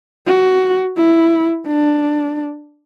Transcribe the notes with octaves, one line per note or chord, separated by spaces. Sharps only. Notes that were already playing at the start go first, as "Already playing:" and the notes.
F#4
E4
D4